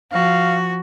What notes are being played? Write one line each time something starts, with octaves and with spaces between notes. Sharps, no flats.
F3 F#4 F5